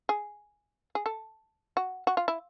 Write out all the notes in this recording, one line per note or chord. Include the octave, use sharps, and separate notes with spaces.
G#4
G#4
A4
F#4
F#4
F4
E4